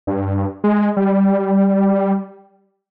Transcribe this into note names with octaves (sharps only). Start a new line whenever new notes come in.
G2
G#3
G3